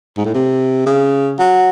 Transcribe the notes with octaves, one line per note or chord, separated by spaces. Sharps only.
G#2
A2
C3
C#3
F#3